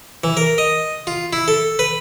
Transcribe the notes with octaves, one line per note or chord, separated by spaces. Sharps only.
E3
A#4
D#5
F4
E4
A4
B4